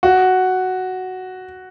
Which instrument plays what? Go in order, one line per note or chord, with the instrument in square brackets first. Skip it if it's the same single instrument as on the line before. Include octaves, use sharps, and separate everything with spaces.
[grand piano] F#4